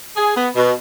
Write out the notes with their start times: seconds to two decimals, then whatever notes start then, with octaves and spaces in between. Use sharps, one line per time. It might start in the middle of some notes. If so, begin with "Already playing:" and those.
0.16 G#4
0.35 B3
0.55 B2